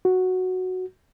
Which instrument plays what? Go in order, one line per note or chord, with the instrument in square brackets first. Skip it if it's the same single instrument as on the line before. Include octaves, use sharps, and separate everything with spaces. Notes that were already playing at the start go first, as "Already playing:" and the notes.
[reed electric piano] F#4